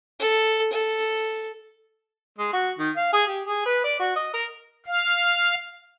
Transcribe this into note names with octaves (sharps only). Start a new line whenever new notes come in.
A4
A4
G#3
F#4
D#3
F5
G#4
G4
G#4
B4
D5
F#4
D#5
A#4
F5